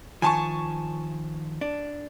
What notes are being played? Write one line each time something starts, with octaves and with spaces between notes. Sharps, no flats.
D#3 F3 G#5 A5 C#6
D4